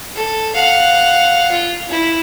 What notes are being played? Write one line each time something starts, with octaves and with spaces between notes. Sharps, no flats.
A4
F5 F#5
F4
E4